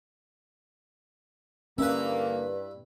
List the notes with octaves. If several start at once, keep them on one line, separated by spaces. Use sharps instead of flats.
G2 D3 E3 A#3 C#4 E4 B4